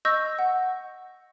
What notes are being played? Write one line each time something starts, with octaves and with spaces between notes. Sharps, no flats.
D#5 C#6 E6 G6 A#6
F#5